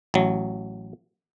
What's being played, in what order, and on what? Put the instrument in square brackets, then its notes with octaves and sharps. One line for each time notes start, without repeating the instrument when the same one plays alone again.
[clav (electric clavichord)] A1 F#3